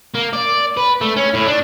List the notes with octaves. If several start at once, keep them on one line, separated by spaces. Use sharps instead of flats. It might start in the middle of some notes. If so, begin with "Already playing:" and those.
A#3
D5
B4
A3
C#4
A2
D4